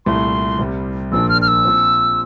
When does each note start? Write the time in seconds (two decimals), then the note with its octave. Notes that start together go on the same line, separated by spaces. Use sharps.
0.06 C2 A#2 A3 E4 C6
0.59 C2 C3 G3
1.12 A#1 A#2 F3 A#3 D4 E6
1.29 F6
1.42 F6
1.48 E6
1.65 A#2 F3 C4